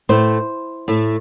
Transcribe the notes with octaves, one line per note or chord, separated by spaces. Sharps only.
A2 A3 C5
A2 A3